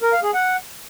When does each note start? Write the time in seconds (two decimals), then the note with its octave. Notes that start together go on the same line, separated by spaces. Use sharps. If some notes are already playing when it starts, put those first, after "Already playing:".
0.02 A#4
0.13 F5
0.23 G#4
0.34 F#5